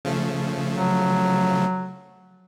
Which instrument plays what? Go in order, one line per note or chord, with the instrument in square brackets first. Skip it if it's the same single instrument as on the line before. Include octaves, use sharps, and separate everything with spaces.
[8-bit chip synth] C#3 F3 A3
[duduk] F#3